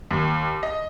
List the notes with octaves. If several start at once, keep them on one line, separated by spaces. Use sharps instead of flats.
D#2
D#5